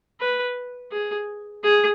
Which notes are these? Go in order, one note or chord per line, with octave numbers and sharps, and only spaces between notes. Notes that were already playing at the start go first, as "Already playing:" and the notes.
B4
G#4
G#4